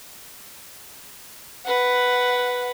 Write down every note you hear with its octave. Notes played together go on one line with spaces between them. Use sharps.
B4 F#5